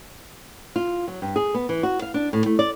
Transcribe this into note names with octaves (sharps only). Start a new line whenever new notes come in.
F4
F#3
G2
G#4
B3
E3
F#4
F5
D4
A2
A3
D5